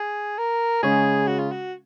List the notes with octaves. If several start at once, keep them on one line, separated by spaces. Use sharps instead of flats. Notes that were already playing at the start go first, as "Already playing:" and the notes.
Already playing: G#4
A#4
C#3 G#3 C#4 G#4
F#4
F4
F#4